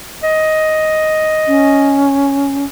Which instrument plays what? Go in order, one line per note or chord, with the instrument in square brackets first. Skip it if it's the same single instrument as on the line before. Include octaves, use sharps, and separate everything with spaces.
[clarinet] D#5
[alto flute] C#4